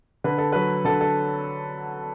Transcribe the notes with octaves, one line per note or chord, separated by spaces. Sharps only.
D3 B4
A4
F#3 B4
D3 A4
A4